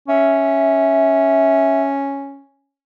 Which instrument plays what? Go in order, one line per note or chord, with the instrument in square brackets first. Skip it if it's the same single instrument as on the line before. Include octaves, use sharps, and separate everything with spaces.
[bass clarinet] C#4 [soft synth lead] E5